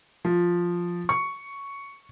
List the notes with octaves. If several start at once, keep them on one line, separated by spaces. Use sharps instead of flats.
F3
C#6